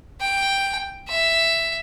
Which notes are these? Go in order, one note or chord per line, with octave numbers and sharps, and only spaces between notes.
G5
E5